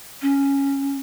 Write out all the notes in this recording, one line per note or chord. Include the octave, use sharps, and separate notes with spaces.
C#4